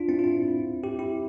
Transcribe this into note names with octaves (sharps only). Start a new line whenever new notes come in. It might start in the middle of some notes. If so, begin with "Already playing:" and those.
Already playing: D4 F4
C4 E4
F4
C4 E4
E4 G4
E4 G4